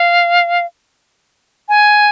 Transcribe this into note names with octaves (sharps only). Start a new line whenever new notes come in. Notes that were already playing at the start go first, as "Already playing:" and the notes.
Already playing: F5
G#5